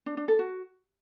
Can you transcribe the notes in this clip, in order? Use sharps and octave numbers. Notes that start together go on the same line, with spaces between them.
D4
D4
A4
F#4